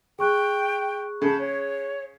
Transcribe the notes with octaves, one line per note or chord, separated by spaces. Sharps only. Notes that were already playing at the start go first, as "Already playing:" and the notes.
G#4 G5 C#6 F#6
C#3 A5 B5 G6
C#5